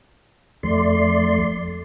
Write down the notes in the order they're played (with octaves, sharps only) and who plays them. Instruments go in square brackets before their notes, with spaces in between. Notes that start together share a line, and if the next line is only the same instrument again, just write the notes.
[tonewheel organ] F2 A3 D5 C6